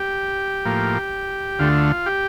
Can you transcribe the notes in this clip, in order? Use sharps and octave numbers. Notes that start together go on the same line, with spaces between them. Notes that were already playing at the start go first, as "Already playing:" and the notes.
Already playing: G4
A2 F3 A#3
D2 D3 A3 F4
G4